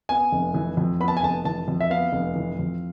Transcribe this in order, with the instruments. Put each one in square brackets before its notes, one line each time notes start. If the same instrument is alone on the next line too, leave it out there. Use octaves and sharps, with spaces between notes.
[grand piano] B3 G#5
F1
E3
F2
B3 B5
A5
G#5
F1 A5
E3 A5
F2
E5
B3 F5
F1
E3
F2